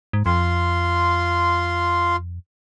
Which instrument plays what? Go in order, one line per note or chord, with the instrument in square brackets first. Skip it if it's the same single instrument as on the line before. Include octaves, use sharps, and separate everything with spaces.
[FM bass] G#2
[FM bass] F2 [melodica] F4 C6